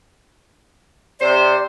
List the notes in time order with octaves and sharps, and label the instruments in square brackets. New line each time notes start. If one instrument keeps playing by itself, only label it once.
[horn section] C3 C5 [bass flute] D5